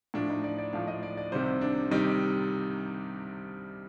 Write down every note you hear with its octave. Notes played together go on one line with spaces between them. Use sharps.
A2 F3 D4
D#4
D5
D5
A2 F3 F5
D#5
D5
D5
C2 C3 D#3 G3 C5
D4
C3 D#3 G3 D#4